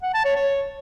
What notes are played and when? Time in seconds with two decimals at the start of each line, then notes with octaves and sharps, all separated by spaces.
0.03 F#5
0.14 A5
0.25 C#5
0.36 C#5